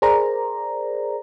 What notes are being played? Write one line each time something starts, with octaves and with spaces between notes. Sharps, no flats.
G#4 A#4 C5 D5 A#5